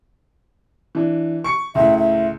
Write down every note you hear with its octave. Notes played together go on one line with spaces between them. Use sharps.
E3 D4
C#6 C#7
C#2 A2 E5
E5